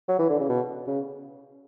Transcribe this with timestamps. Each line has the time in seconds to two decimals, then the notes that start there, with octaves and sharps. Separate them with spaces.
0.09 F#3
0.19 E3
0.30 D3
0.39 C#3
0.49 B2
0.87 C#3